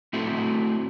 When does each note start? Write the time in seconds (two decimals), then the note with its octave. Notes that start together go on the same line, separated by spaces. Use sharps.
0.13 A3 C4 E4 F#4 A4